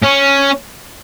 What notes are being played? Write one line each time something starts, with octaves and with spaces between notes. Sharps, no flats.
C#4